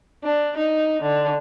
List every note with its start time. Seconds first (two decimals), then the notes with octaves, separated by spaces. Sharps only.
0.24 D4
0.57 D#4
1.02 D3